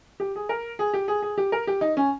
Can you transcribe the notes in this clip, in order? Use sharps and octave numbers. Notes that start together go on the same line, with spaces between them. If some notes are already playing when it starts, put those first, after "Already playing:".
G4
G#4
A#4
G#4
G4
G#4
G#4
G4
A#4
G4
D#4
C#4